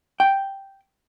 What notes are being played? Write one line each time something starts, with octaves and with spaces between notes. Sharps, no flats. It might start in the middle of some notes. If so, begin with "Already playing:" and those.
G5